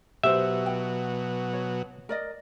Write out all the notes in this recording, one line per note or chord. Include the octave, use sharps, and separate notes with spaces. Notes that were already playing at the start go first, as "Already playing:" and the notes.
B2 F#3 G4 C5 E5
G5
C#5
A#4 D5 D#5